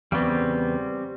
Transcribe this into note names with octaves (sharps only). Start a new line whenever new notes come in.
E2 C#3 G3 B3 C4